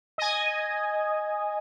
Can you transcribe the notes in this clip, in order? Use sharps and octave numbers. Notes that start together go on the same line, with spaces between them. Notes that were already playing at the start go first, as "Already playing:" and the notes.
D#5 G#5